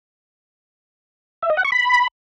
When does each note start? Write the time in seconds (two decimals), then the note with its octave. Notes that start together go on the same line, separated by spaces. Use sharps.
1.42 E5
1.50 D#5
1.57 F#5
1.65 C#6
1.72 B5